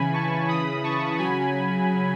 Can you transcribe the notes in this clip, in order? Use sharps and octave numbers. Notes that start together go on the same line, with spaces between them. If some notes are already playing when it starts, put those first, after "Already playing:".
Already playing: C#3 E3 G#5 B5
A5 C#6
C#3 E3 B5 D#6
A5 C#6
C#3 F#3 G#5 B5